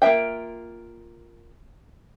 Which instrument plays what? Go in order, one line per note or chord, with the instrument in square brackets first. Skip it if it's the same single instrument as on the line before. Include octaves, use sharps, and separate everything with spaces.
[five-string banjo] A#3 F4 A#4 E5 G5